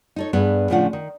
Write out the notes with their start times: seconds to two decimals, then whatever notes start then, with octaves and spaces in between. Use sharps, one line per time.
0.16 D#4 A4 C#5
0.33 G2 B3 G#4
0.70 A2 C#3 F3 D4 F4 F#5
0.93 D#3